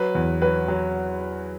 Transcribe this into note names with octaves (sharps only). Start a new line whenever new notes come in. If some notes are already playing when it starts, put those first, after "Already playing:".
Already playing: F#3 B4
E2
F#3 B4
F#3